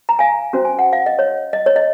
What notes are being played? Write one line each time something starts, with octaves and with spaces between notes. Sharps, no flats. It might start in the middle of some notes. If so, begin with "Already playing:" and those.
A#5
F5 G#5
C#4 F#4 C5
G#5
F#5
F5
D#5
C#5
D#5
C#5
D#5